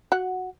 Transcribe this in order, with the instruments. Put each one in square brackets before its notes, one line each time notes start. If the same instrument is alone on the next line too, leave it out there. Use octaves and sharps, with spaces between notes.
[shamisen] F#4 F#5